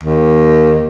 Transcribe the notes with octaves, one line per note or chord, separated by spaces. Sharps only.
D#2